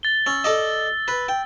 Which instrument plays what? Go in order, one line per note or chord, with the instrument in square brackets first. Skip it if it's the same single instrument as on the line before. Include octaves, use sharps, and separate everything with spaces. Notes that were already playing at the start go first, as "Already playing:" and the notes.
[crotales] A6 G7
[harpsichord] C#4 [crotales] E6
[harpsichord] A4 D5 D#5
B4
G5